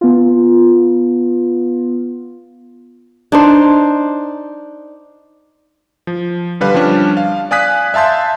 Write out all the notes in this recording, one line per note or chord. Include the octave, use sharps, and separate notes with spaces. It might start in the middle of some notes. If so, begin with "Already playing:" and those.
B3 F4
D4 D#4 C5
F3
D3 G3 B4 F5
F3 G3 C#4 D4
F5
D5 F5 G#5 D#6 F#6 B6
E5 F5 A5 C6 G6